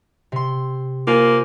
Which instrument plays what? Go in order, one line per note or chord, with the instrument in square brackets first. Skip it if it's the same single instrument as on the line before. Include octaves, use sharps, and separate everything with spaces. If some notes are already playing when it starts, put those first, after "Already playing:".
[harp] C3 C6
[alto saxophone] A#3 [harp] F4 C5 G#5